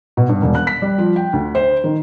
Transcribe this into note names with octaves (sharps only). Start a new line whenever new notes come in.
B2
G2
E1
F#6
B6
G3
F3
G5
D2
C5
D#3